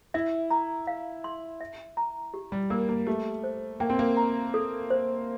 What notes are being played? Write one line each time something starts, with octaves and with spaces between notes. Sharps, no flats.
E4 E5
A#5
F5
C6
E5
A#5
G4
G3
A#3 A#4
A#3
A3 G4
C5
A#3 G5
C4
A#3
A#5
A4
C5